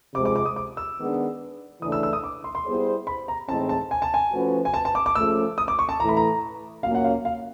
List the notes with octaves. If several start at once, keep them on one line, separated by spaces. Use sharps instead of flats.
C3 F3 G#3 D6
D6
D6
D#6
D6
E6
D#3 G#3 B3 D4
C#3 E3 A3 D4 D#6
E6
E6
D#6
D6
C6
C6
G3 B3 E4 G#4 C5
B5
A#5
A2 E3 G#3 C4 D#4 A5
A5
G#5
A5
G#5
F3 A3 C#4 F#4 B4
G#5
A5
A5
D6
D6
C#3 F3 A3 E6
D#6
D6
C#6
A5
A2 E3 A3 A#5
B5
A#5
A#2 F#3 A#3 C#4 F5
F#5
F5
F5